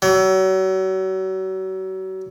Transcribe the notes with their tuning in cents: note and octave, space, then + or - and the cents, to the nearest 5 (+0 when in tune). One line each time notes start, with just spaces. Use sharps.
F#3 +35